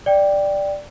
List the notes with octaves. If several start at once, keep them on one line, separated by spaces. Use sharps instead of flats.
D5 G5